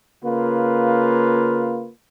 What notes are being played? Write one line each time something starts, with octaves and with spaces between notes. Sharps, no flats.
C#3 A#3 F4 B4